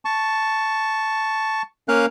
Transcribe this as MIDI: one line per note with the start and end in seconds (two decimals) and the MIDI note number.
0.05 1.62 81
0.05 1.62 85
1.88 2.06 58
1.88 2.06 61
1.88 2.06 70
1.88 2.06 77
1.88 2.06 90